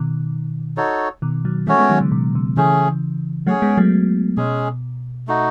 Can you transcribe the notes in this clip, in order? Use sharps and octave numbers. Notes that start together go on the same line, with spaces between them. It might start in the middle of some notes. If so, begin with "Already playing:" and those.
Already playing: B2 D#3
D#4 F#4 A4 C#5
B2 D#3
D#3 F#3
E3 G#3 A3 C#4 F#4 C#5
G#3 B3
D#3 F#3
C#3
B2
C#3
C#3 E3 A3 C#4 G#4
F#3 A3 C#4 G#4 C#5 F#5
G#3 B3
F#3 A3
B2 G#3 C#4 G#4
A3 D#4 F#4